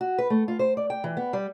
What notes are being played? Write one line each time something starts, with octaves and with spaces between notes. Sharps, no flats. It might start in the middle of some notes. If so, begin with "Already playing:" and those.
F#4
B4
A3
F4
C5
D5
G5
E3
B3
G3